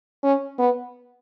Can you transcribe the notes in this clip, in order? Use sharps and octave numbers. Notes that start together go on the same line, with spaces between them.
C#4
B3